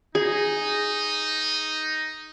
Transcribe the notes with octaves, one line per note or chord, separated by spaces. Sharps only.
D#4 G#4